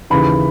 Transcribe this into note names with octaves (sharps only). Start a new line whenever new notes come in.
D#2 C#3 E3 B5